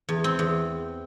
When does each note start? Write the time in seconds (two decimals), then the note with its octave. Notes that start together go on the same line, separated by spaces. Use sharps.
0.09 E2
0.24 C4
0.39 E2